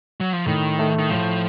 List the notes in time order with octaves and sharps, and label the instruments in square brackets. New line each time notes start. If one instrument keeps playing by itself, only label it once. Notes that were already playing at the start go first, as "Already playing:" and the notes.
[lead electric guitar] F#3
F3
[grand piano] A2 [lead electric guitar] D#3
[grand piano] A3
[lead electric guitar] D#3
[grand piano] A2 [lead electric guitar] F3